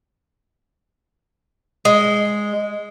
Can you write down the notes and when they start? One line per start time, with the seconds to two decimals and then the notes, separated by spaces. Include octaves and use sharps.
1.85 G#3